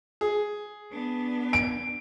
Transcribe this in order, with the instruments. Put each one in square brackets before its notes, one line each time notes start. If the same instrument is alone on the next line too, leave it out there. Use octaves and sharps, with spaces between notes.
[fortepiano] G#4
[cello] B3 D4
[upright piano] D7